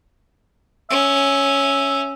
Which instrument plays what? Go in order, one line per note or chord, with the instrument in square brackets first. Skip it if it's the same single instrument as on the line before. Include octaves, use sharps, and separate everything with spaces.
[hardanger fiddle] C#4 [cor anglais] E5